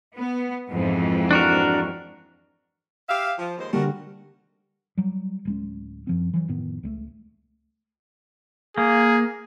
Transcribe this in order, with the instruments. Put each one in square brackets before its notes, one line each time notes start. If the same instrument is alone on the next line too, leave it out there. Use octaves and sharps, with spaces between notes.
[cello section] B3
F2 G#2 E3
[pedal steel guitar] D4 F#4 A#4
[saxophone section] G4 E5 F5
F3
D#2 G#3 C5
[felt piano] D3 G3 [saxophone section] A3 F#4 A#4
[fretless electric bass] F#3 G3
D1 G#3 C#4
F#2 F3 C4
E3 F#3
F1 A2 D#3 B3
C#2 G3 A3
[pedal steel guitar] A#3 [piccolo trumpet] G#4